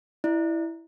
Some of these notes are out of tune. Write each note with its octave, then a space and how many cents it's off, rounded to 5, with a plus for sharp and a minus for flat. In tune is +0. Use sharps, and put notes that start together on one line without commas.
E4 +0 D5 +30